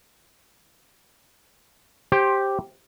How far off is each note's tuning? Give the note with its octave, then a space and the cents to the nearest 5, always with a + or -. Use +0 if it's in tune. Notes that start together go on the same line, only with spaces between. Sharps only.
G4 +0 C5 +20